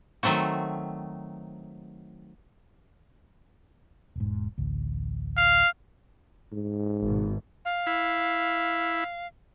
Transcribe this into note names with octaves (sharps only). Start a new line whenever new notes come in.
D#3 F#3 A3 C4 F#4
E1 G#2
A1 D2
F5
G#2
G#1 B2
F5
E4